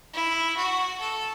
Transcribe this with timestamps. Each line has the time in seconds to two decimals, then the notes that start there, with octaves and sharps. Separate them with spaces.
0.14 E4
0.56 F#4
1.00 A4